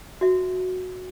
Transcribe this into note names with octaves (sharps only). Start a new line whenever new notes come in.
F#4 E5